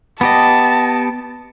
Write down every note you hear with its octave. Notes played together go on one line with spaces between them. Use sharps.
B3 G4 D#5 A5